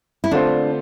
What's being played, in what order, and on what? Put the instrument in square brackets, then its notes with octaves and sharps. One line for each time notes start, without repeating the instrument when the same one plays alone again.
[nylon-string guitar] E4
[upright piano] D3 A3 C4 F4 C5 [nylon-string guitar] D4